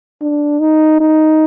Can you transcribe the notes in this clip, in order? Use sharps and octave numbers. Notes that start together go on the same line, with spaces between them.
D4
D#4
D#4